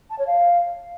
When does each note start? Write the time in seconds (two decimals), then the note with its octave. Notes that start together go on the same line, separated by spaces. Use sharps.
0.10 A5
0.19 C#5
0.27 F5